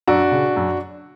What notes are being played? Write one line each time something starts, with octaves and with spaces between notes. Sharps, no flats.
F#2 D4 F#4
C#3
F#2